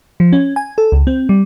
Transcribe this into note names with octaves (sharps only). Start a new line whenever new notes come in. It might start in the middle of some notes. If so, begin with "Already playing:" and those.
F3
C#4
G#5
A4
C#2
C4
G3